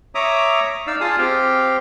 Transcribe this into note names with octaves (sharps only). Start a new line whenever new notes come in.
C#5 E5 A#5 D6 D#6
D#4 D5 F5 E6
F4 G#4 F5 A5 D#6
C4 G4 F5 G5